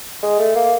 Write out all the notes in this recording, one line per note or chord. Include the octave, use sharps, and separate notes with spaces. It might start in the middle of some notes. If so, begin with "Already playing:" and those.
G#3
A3
A#3